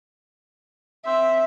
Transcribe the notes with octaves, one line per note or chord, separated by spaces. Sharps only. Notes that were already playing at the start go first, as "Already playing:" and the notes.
C4 E5